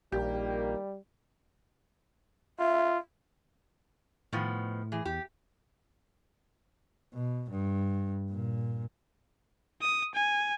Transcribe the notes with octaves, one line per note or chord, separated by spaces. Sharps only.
A#1 D#3 G3 A#3 G4
F4 E5
A2 D#3 F3 B3
E3 G#4
E2 G4
B2
G2
A#2
D#6
G#5